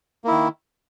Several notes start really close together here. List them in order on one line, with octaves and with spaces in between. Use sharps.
A#3 E4 D#3